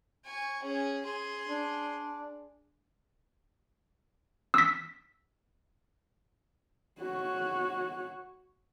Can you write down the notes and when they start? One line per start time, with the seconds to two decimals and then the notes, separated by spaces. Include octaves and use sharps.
0.24 G#5 C#6
0.62 C#4 G#4
1.05 G#4 C6
1.48 D4
4.54 E6 B6
7.00 F#4 C#5